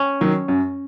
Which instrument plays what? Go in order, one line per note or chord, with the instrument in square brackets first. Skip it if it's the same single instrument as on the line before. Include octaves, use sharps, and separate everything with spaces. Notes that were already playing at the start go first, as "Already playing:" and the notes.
Already playing: [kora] C#4
[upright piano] D#3 F#3
F#2